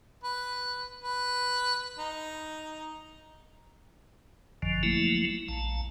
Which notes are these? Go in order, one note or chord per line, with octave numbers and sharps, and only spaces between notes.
B4
B4
D#4
G#1 F#2 D3 F3
F3 F#3 A3 A#3 E4
A#1 A5